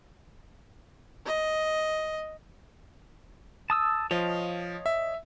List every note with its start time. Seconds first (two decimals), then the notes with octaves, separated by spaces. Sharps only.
1.26 D#5
3.70 A5 D#6 E6
4.11 F3 C#5 D#5 F5
4.86 E5